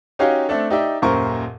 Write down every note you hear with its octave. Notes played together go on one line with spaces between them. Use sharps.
C#4 D#4 F#4 G4 C#5 F5
A3 C4 D4 A4
D#4 G4 D5 E5
D#1 F#2 A#2 A#4 C5 C#6